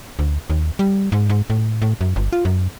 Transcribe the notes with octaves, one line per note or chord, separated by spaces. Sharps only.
D2
D#2
G3
G#2
G#2
A2
A2
F#2
G1
F4
F#2